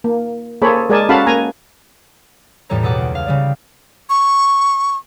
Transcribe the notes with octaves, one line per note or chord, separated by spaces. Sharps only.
A#3
A#3 G#4 A4 C5 C#5 B5
G#3 G#4 A#4 D5 G#5 A5
C#4 F#4 A4 F5 A5 B5
A#3 G#5 A#5
E2 A2 G3 A4 C#5 A#5
B2 G#4 A4 F#5 D6
C#2
F5
C#3 G3 D5
C#6